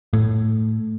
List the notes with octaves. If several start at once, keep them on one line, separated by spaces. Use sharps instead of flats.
A2